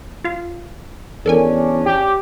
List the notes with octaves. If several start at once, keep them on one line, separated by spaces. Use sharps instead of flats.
F4 F5
E2 C#4 D4 A4 A#4 G#5
G4